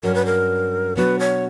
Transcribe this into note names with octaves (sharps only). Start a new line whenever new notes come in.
G2 F#3 C#4 A#4
B4
A#4
B2 F#3 B3 D4 F#4 B4
C#5